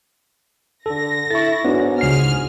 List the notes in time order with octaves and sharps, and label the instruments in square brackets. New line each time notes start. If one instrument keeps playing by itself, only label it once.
[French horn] D3 [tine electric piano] A4 [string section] A#6
[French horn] E4 [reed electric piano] A4 C#6 [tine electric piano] A6
[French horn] G#2 [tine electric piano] B3 [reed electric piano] D4 F#4 C#5
[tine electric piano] C#2 C7 [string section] G#4 F6